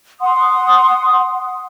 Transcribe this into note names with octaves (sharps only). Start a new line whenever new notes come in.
F#5 C6 D#6